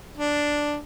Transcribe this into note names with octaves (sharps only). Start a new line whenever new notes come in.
D4